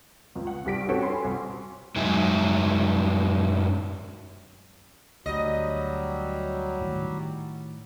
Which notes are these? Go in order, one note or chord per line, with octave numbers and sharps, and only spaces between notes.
C#2
F#5
C2 G3 B6 D7
C4 C#4 F#4 A4
G#5 B5 C6
C2
F#2 F#3 G#3 D#4 E5 G#5
D2 F#3 G3 D#5
A2 D#3